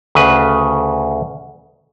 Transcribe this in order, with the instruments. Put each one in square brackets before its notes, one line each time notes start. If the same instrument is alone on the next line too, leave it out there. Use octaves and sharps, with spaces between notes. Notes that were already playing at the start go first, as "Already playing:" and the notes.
[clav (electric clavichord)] D2 C#3 B4